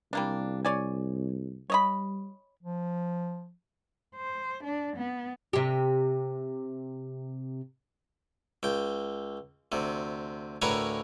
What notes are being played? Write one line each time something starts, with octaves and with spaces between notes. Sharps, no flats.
C2 G3 A#3 D4
C#5 D5 G#5
G3 C#5 D#5 B5
F3
C5
D4
B3
C3 G4
C#2 G5
D2 C3
D2 A2 A#4 B4 C#5 G#5